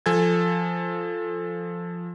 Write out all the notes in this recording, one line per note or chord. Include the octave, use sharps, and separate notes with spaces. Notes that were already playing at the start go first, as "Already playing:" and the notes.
F3 A4 G#5 G#6